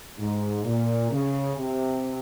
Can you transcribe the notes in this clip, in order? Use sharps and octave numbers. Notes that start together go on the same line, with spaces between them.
G#2
A#2
C#3
C3